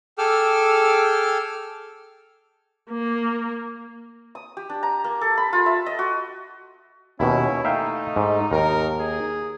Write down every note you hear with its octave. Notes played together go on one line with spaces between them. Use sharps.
G#4 A4 G5 D6 E6 F6
A#3
D#6
G4
D4
A#5
A#3
A4
B5
F4
E5
D#5
F#4
D#2 B2 C#4 E4
A3 D#4 E5 F5 G5
G#2
D#2 A#4
G#4